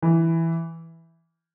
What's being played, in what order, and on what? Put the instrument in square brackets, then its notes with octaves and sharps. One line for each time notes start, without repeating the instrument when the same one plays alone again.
[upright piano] E3